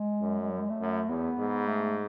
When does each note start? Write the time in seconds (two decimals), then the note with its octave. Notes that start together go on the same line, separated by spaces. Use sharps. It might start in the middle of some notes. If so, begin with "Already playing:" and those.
Already playing: G#3
0.21 F#2
0.41 G#3
0.51 F#3
0.60 G#3
0.70 A3
0.80 F#2
1.09 E2 B3
1.39 G#2
1.68 A3